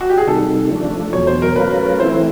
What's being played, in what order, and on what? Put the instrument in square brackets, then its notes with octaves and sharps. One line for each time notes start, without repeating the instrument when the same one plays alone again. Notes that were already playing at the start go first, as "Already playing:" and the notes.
[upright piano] F#4
G4
G#4
[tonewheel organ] C3 D#3 G3 [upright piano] A4
[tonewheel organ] F3 A3 D4
[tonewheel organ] E2 B2 F#3 [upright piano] C#5
[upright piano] C5
A#4
[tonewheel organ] F#3 A3 C#4 F4 A#4 [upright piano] B4
[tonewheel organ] E3 A3 C4 E4 [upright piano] C5